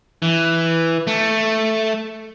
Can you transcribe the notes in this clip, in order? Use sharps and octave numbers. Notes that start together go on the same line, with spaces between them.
E3
A3